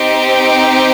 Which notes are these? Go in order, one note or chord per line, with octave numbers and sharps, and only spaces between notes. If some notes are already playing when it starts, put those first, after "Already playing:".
Already playing: C4 D#4 G4